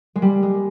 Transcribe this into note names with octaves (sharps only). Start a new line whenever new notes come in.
G#3
G3
G#3